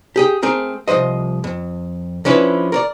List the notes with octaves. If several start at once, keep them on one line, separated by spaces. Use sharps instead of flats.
G4 G#4 G5
A3 C4 G#4 A#4
C2 F#2 F3 C5 D#5
F2
D3 F3 C#4 E4 B4
A#4 C#5 D5